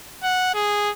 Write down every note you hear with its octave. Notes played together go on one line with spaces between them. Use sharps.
F#5
G#4